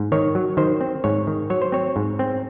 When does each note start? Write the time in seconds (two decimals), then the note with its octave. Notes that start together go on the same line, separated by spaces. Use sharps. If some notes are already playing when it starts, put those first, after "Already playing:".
Already playing: G#2
0.12 D#3 C#5
0.35 F#3
0.57 D#3 C5
0.81 C4
1.04 G#2 C#5
1.27 D#3
1.50 F#3 C#5
1.62 C5
1.72 C4 C#5
1.96 G#2
2.19 C4